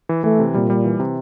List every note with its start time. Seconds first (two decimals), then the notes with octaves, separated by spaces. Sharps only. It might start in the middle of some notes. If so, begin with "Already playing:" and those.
0.09 E3
0.24 E3 A3
0.39 C3
0.54 A#2 G3
0.70 G3
0.85 E3
1.00 C3